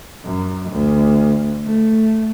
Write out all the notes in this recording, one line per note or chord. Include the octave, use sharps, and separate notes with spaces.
F#2
D2
A3